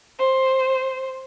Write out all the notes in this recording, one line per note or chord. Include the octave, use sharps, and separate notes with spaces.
C5